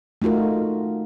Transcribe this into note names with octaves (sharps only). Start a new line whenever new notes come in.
A3 D#4 F4 F#4 A#4